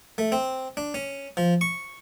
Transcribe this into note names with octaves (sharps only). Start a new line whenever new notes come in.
A3
C4
D4
C#4
F3
C#6